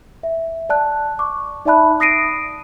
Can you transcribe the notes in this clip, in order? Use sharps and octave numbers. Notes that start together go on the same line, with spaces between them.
E5
D5 A5 F#6
C#6 D6
D#4 D5 E5 A5 B5 F#6
D#6 A#6 C7 D7 D#7